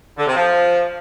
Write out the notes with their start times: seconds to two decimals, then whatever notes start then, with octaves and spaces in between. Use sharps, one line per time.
0.17 D3
0.26 C3
0.35 F3